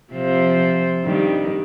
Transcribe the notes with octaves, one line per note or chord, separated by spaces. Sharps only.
C3 F3 C5
G2 D#3 G3